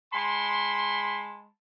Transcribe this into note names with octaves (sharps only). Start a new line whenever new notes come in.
G#3 A5 B5 C6